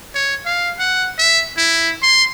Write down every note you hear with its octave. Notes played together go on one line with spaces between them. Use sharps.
C#5
F5
F#5
E5
E4
C6